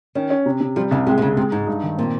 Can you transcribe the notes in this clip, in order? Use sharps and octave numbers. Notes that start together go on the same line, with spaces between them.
D#3 C#4
C#4
C3
C3
F3 G3
C2 C#3
C3 G#3
C3
C#2 C#3
C3 G#3
G#2 D#4
G2
D#3
A#2 C4